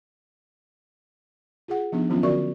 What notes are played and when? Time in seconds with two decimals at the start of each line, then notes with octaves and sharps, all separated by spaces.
1.68 F4 G#4 F#5
1.92 F3 B3 D4 D#4
2.09 D#3 F3 F#3 B3 C#4 F4
2.23 D3 F#4 A#4 D5 E5 C#6